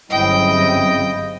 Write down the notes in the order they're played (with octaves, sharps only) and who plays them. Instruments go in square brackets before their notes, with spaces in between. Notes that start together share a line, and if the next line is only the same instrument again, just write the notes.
[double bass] G1 F#3 [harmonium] C#3 C4 E4 [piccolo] D#5 [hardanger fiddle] G5